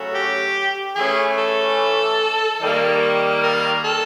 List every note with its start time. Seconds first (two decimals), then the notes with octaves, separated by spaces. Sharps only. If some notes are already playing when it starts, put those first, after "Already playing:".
Already playing: C#3 F#3 A3 C#4 F#4
0.14 G4
0.95 E3 A3 C#4 G#4
1.37 A4
2.61 D#3 G3 A#3
3.43 A#4
3.84 A4